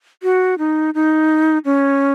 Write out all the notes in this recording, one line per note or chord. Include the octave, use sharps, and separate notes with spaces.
F#4
D#4
D#4
C#4